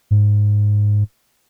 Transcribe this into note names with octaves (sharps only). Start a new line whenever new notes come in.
G#2